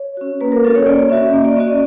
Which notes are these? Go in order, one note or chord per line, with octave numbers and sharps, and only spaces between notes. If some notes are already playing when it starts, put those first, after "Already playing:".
Already playing: C#5
C#4 F#4
A#3 B4
A#4
C#4 F#4 A4
C#5
A#3 D5
C#4 F#4 E5
A#3 D#5
D5
C#4 F#4 D#5
D5